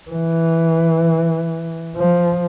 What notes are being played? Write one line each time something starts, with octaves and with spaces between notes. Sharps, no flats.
E3
F3